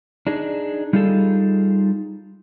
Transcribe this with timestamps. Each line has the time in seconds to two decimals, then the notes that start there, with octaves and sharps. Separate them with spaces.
0.27 D4 D#4 G#4
0.93 G3 D#4 F4 G#4 A4